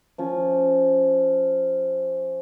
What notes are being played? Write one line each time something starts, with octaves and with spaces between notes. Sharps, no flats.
F3 C#4